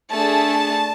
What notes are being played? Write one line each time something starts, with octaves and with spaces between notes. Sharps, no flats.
A3 D4 G#4 A5